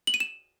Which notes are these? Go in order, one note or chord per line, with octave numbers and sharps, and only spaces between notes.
F#7
D#7
E7